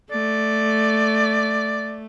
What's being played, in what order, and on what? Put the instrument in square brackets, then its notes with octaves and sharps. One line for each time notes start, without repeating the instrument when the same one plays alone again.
[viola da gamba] A3 [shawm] D5